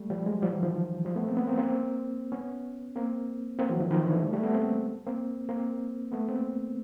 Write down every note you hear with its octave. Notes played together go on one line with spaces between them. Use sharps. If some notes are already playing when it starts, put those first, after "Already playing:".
Already playing: G3 A3
F3 G3
F#3 G#3
F3 G3
E3 F#3
D#3 F3
F3 G3
A3 B3
A#3 C4
B3 C#4
A#3 C4
A#3 C4
B3 C#4
A#3 C4
A#3 C4
E3 F#3
D#3 F3
D#3 F3
D3 E3
G3 A3
G3 A3
A3 B3
A#3 C4
A#3 C4
A#3 C4
A3 B3
A#3 C4